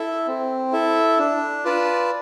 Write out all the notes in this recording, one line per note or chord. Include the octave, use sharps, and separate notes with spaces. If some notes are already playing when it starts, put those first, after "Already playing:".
Already playing: E4 A4 E5
C4
E4 A4 E5
D4
F4 B4 D5 A5